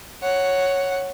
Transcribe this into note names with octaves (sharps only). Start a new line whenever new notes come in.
C#5 F#5